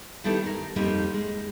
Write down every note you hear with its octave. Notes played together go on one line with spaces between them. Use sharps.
D#3 G3 B3 E4 A4
A#4
F2 G3 A#3 C4 D#4
G#3